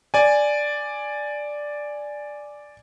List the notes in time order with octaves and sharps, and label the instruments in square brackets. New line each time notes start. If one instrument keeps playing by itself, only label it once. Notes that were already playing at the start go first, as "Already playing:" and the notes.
[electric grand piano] D5 G#5